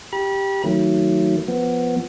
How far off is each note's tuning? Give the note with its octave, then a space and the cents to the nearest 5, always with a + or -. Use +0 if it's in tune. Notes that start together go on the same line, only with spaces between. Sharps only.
G4 +0 B5 -35
D#3 +15 F#3 +0 A3 +30
F3 +0 B3 +0